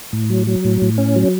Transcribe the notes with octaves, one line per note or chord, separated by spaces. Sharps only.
A2
F#3
F#3
A2
A2
C#4
F#3